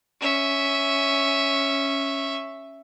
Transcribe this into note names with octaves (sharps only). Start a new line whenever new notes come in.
C#4 E5